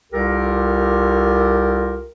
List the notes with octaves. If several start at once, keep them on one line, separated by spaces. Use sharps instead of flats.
C2 F4 G4 A4 A#4